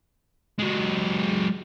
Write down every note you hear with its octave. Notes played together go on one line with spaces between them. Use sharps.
F#3 G#3